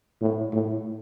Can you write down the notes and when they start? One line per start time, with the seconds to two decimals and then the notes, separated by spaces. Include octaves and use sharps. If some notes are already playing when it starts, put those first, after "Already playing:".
0.21 A2
0.53 A2